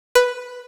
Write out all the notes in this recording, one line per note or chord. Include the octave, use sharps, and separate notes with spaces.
B4